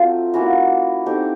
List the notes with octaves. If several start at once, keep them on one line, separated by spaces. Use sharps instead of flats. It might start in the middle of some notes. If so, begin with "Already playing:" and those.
Already playing: F#3 A3 C4 F4
A#3 C#4 E4 F#4
A3 C4 D#4 G4